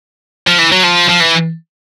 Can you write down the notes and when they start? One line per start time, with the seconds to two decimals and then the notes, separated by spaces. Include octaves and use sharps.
0.47 F3
0.59 E3
0.72 F#3
0.84 F3
1.09 F3
1.21 E3